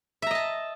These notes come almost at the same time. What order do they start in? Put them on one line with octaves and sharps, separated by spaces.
E5 A#5 D#5 A5